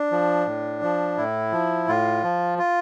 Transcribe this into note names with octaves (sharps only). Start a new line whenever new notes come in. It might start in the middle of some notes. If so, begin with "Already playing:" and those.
Already playing: D4
F3
A2
F3
A2 E4
F3
A2 F4
F3
F4